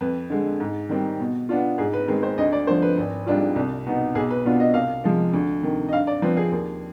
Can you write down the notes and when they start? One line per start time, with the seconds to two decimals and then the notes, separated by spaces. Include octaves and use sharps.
0.01 F2 B4
0.30 D3 G#3
0.60 G#2
0.89 D#3 G3 C4
1.20 B2
1.49 B3 D4 F4
1.78 G#2 G#4
1.93 B4
2.08 D#3 G#3 C4 B4
2.23 C5
2.38 D2 D#5
2.53 D5
2.67 D3 F3 C5
2.82 B4
2.97 G#1
3.26 G#2 G3 D4 F4
3.56 C2
3.86 B2 B3 D#4
4.15 B1 G#4
4.30 B4
4.45 B2 B3 D4 F4
4.60 D#5
4.74 C2 F5
5.04 C3 F3 G#3
5.33 D2
5.63 C3 D#3
5.88 D#5
5.93 G2 F5
6.07 D5
6.22 F3 C4 F4 B4
6.37 G#4
6.51 D#2